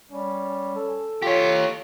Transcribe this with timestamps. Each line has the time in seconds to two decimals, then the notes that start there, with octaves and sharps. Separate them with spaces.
0.11 G3 C#4
0.76 A4
1.22 F4 G4 C#5